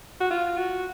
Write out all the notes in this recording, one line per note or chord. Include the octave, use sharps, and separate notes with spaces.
F#4
F4
F#4